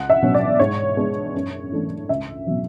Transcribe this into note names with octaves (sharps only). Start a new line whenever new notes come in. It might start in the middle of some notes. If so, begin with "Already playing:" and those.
Already playing: C#2 F#5
E5
B2 F#3 C#4
D5
G#2 C#5
G#3 B3 D4
F#2
E3 A3 D4
C#2 E5
B2 F#3